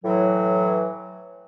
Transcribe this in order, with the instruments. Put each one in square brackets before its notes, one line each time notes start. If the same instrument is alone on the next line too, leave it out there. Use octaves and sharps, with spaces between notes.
[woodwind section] A2 E3 F#3